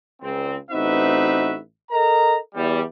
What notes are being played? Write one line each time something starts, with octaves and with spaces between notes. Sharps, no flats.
C#2 C4
A1 C4 D#4 F#4 B4 E5
A4 A#4 D#5 A#5
E2 G3